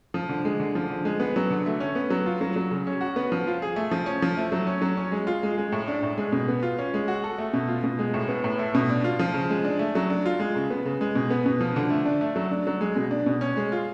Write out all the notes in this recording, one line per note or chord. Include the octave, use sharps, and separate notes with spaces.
F3
D3
G#3
D3
F3
D3
G#3
B3
F#3
D3
A3
C#4
B3
F#3
F4
F#3
F#3
C#3
C#4
F#4
B3
F3
F4
G#4
A3
F3
C#4
F3
A3
F#3
C#4
F#3
C#4
G#3
F4
G#3
G#3
A2
D4
A2
G#3
B2
B3
F4
C#4
G#3
F#4
A4
A3
B2
F4
B2
G#3
A2
B3
A2
A3
B2
D4
F4
F3
C#3
G#3
D4
A3
F#3
D4
F4
G#3
C#3
B3
C#3
G#3
B2
B3
B2
F3
D3
A3
D4
A3
F#3
D4
F#3
G#3
B2
D4
B2
C#4
G#3
F4